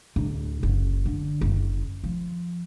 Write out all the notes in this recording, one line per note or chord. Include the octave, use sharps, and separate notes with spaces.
D1 D2
F#1 C#3
D3
F#1
F3